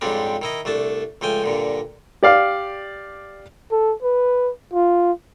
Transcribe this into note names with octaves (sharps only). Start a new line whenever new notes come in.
F2 G#2 C#3 G3 C4 D4
D#3 E4 D#5
C2 A3 D4 A5
C#2 F3 A3 G5 G#5
G2 A#2 D3
G4 D5 F5
A4
B4
F4